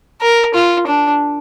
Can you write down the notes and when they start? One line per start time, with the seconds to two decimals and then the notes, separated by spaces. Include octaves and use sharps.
0.22 A#4
0.55 F4
0.87 D4